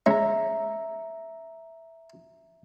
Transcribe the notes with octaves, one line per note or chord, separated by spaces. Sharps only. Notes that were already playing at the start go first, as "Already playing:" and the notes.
G#3 C#4 E5 A#5